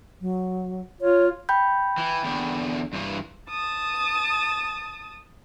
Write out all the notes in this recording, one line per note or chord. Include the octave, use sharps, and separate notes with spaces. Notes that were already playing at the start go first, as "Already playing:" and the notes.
F#3
F4 C#5
G5 B5 G6
E3
E2 D3
G2 E3
A5 D#6